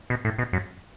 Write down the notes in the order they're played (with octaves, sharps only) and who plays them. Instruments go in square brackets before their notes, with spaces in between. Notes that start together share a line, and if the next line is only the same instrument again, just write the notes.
[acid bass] B2
A2
B2
F#2